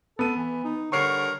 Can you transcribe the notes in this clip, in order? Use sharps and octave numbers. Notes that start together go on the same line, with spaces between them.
B3 A4 D#7
E3
D#4
G2 D3 A#4 C#5 C#6 C7